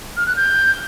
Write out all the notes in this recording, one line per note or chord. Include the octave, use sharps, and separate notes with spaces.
F6
F#6
G6